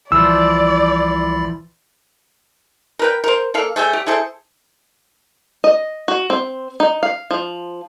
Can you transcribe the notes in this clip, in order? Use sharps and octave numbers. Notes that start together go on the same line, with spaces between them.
C2 E3 F3 D5 B5 E6 A6
A#4 B4 G5
A#4 C5
A#3 A4 F5
A3 G#4 E5 G5
G4
E4 G#4 A4 C5
D#5
F#4
C4
D#4
F5
F3